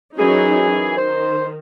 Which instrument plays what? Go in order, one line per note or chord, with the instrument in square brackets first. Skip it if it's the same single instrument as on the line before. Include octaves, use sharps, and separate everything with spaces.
[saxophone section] F#2 E3 G#4 [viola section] F#3 C#4 D#4
[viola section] D#3 [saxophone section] C5